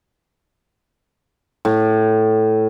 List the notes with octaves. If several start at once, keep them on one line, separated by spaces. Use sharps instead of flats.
A2